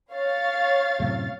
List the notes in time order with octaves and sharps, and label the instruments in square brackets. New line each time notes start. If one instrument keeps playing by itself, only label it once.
[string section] C#5 F5 A6
[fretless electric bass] F#2 A2 C3